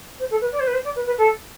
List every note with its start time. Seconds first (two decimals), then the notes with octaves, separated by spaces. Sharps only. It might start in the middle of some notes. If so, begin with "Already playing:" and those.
0.19 C5
0.30 A4
0.41 B4
0.52 D5
0.59 C5
0.67 B4
0.73 C5
0.84 D5
0.96 B4
1.06 B4
1.17 A4